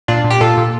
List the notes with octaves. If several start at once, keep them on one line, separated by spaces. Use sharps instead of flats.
A#2 D4 F4
A#2
G4
A#2 F4 A4
A#2